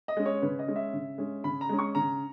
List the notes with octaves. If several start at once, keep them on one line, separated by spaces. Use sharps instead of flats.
D#5
G#3 C#4
C#5
C#3 B4
D#5
G#3 C#4
E5
C#3
G#3 C#4
C#3 B5
A#5
G#3 C#4
C#6
C#3 A#5